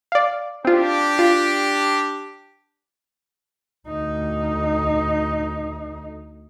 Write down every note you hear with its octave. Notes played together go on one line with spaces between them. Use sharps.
D5 F5
C4 D4 F4 G4
F4
D2 D#4